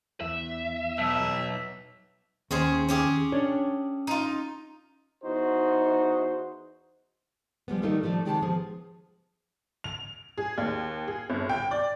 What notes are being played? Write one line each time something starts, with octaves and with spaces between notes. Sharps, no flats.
E2 E5
B1 E5
D#2 C#4 G#4 C5
C#4 G4 G#4
D4 C#5
D#4 F4
E2 D#4 F#4 C5
F3 G3 G#3 B3
D#3 G3 A3 A#3 D#4
F3 G3 A3 D5
C3 D#3 G#3 G4 D5 A5
F3 B3 G#4
F7
G#4
D#2
G#4
G1
G5
D5